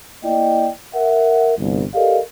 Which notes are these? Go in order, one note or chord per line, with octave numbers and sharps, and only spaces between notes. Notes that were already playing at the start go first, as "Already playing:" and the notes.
A#3 E4 D5 D#5 G5
A#4 E5 F#5
G1 C2
G4 A4 A#4 D5 D#5 F5